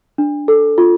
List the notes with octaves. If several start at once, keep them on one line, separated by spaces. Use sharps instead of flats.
D4
A4
F4